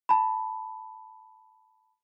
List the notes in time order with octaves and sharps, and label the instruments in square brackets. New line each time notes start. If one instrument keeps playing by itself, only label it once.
[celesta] A5 B5